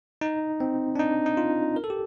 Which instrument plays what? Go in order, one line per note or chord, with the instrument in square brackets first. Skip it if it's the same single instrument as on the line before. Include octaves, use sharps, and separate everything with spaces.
[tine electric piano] D#4
C4
D4
D#4
D#4
F4
A#4
A4
G4